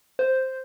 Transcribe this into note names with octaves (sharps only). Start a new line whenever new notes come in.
C5